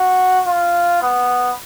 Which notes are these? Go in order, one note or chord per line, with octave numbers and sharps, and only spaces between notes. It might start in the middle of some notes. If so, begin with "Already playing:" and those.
Already playing: F#4
F4
B3